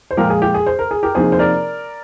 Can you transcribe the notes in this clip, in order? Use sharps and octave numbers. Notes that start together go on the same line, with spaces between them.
C5
A#2 F3 G#3 G4 A#4
G#4
G4
G#4
C5
A#4
G#4
G4 A#4
C3 F3 A#3 D#4 G#4 C5
C5
A#4 D5